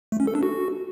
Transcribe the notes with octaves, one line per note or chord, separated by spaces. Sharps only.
A3
C#4
A4
D4
F#4